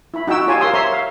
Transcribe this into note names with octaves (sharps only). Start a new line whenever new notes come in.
E4 B5
D#4 F#4 G5 E6
F4 G4 C#5 F5 G#5 A5
A#4 F5 C6 D#6 E6
C#5 E5 A#5 C6
F5